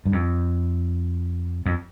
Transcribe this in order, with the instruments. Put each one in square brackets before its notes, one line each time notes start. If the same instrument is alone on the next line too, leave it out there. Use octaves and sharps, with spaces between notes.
[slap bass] G2
F2
F2